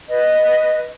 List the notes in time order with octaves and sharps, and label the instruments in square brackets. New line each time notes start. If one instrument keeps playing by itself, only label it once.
[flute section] B4 D#5